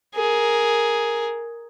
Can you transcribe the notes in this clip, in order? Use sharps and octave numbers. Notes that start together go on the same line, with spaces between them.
G#4 A#4